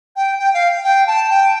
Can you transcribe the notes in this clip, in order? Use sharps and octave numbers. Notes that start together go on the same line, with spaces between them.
G5
G5
F5
G5
A5
G5